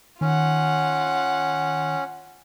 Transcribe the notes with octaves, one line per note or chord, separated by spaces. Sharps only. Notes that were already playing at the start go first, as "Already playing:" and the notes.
D#3 C#4 F4 F#5